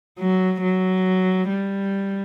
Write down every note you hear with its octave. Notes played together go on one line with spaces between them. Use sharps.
F#3
F#3
G3